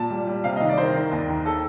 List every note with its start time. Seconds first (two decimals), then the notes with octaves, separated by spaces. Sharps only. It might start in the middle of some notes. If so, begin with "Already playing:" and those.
Already playing: A#2 A5
0.10 G3
0.27 G3
0.44 C3 F5
0.56 D#5
0.61 D#3
0.69 D5
0.78 D#3 A#4 C5
0.95 D#3
1.12 D#2
1.28 D#3
1.46 A4